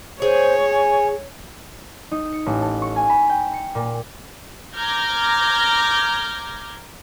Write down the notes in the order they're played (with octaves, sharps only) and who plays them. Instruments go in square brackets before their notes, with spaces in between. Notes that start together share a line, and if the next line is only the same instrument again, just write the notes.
[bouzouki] G#4 [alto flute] C5 [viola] C#5
[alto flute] G#5
[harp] D#4
C#7
A1
A4
C#6
G#5
B5
G5
C#7
A#2
[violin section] A#5 D6 F6 G6 G#6 A#6